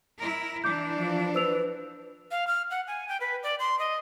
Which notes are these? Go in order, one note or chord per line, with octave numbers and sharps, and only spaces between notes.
E4 A#4
E3 D4 D6 G6
F3
B4 C5 E6 F7
F5
F6
F#5
G#5
G5
B4
D5
C6
D#5